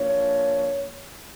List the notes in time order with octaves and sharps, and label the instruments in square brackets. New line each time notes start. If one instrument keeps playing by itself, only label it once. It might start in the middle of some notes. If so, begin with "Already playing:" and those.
Already playing: [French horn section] F3 A#3 D4 C#5